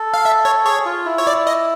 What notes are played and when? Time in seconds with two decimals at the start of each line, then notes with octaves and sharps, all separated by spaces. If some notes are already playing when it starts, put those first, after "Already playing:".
Already playing: A4
0.14 F5
0.25 E5
0.45 C#5
0.65 G#4 C#5
0.86 F4
1.06 E4
1.18 C#5
1.27 D5
1.47 D#5